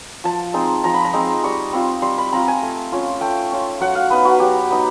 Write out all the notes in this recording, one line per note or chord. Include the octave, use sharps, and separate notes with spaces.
F3 A5
G#3 C4 D#4
F3 A#5
B5
A#5
G#3 C4 D#4
G3 C#6
C4 F4
G3 C6
B5
C4 F4 A#5
G#5
A3
C#4 F4
A3 G5
C#4 F4
F#3 F#5
F5
B3 D#4 B4
F#4
F#3 G4
B3 D#4